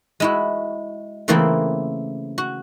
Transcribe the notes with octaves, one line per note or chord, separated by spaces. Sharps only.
G#3 E4 F#4
C#3 E3 A3 A#3 C4 E4
F#4